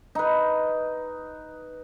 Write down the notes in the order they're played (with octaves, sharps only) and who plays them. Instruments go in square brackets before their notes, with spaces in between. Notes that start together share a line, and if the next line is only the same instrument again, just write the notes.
[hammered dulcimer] D#4 B4